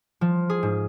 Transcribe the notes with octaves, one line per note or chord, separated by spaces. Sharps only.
F3
G#4
G#2